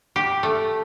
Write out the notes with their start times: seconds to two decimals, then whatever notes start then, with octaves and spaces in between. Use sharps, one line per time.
0.16 G4
0.43 A3